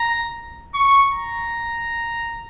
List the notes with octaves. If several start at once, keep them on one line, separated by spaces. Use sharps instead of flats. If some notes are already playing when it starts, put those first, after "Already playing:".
Already playing: A#5
C#6
A#5